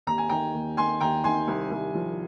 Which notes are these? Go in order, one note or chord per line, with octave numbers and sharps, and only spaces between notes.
D#2 A#5
G#5
D#3 G5 A#5
D#2
D#3 G#5 C6
D#2 G5 A#5
D#3 G#5 C6
C2
C2
F3